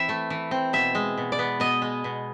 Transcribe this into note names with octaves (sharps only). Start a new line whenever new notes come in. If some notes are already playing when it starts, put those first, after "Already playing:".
Already playing: E3 C4 E5
A3
E3
C4
B2 E5
G#3
B2
D5
B3
B2 D#5
G#3
B2